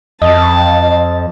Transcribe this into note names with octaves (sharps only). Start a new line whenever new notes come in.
F2 D#5 A5